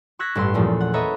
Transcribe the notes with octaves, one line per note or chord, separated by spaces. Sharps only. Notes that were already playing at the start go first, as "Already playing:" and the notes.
C#6 E6 F#6 G#6 A#6 B6
A1 G2 C#4 C6
E2 A#2 F3 A3
F#5
A4 B4 C#5 D#5 E5 A#5